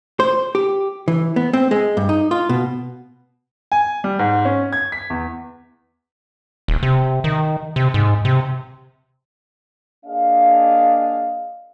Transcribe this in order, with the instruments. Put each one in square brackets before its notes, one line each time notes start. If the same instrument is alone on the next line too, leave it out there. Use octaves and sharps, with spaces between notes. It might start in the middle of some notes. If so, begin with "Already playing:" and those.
[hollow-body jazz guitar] C5
G4
E3
B3
C4
G#3
G2
D#4
F4
B2
[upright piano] G#5
G3
G#2
C#4
G#6
B6
E2
[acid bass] D#1
C3
D#3
C3
G#2
C3
[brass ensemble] A#3 D4 G#4 D#5 F5